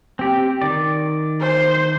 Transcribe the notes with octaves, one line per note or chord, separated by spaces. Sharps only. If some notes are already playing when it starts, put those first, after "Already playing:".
C4 G4
D#3 D5
C5